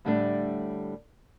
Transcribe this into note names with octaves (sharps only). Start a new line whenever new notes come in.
A2 D3 G3 A3 D4